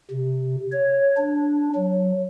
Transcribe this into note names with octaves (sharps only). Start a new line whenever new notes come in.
C3
C#5
D4
F#3